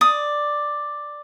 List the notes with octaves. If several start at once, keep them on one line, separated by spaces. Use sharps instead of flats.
D5 D#6